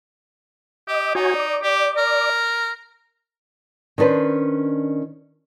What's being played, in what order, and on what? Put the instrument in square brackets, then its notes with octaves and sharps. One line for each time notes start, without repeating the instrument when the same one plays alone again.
[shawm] G4 [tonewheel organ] D#5
[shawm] D#4 [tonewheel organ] F#4 C#5 G#5
[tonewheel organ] D5
[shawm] G4
A#4
[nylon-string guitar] D#3 C#4 D4 B4 C5